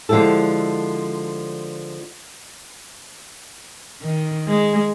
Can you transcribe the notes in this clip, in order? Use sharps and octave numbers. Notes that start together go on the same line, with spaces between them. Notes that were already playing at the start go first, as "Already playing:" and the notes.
D3 F3 G#3 E4 G4 A4
D#3
G#3